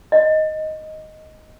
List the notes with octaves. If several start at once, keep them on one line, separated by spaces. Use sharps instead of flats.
D#5